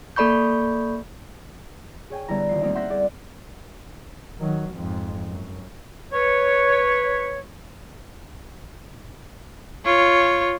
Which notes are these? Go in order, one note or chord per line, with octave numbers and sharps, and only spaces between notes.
A#3 A4 D5 B5 C#6 G6
G#4 C#5 G5 G#5
D3 G3 B3 E4 A#5
D#1 C7
G3 A3 A#3 C4 D#4 E4
E5 F#5 C6 G6 A#6 B6
G#4 A4 D5
D#3 F#3
F2 G#2
F#2
B4 C#5
F4 C#5